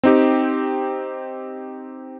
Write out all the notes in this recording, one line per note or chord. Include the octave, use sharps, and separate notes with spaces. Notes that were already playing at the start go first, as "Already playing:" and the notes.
C4 D#4 G4